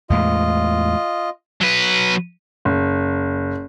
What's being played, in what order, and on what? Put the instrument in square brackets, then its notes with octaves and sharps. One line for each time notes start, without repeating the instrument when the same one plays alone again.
[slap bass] E2 A2 G#3 [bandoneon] F4 D#5
[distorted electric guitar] F#3 B4
[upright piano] F#1